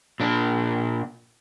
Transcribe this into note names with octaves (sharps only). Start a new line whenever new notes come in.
A#2 D4